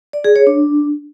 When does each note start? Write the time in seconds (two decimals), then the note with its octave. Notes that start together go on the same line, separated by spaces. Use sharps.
0.13 D5
0.24 G#4
0.36 C#5
0.47 D4